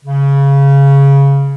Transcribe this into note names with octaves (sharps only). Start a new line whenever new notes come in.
C#3